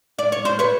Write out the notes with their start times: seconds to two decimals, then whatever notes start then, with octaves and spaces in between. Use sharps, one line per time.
0.19 D5
0.32 C#5
0.45 C5
0.59 B4 C#5